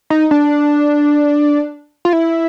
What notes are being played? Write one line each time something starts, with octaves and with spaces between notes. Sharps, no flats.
D#4
D4
F4
E4